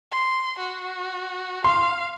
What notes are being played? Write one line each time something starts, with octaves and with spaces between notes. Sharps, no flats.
C6
F#4
F5 C6